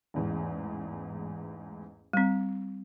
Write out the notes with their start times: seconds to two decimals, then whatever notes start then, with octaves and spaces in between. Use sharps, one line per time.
0.14 A1 E2 G#2
2.13 G3 C4